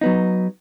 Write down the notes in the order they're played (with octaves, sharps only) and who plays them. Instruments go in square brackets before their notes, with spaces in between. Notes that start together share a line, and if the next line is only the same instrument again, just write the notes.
[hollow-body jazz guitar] F#3 B3 D#4